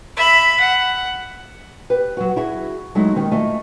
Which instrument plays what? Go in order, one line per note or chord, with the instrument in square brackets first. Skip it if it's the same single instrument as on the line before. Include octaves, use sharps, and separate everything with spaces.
[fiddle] E5 B5
F#5
[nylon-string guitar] G4 B4
F#3 F#4
E4 F#4 G#4
F#3 G#3 A3 D#4 E4
D#3 C#4 G4
A3 F4 A#4 D#5 G#5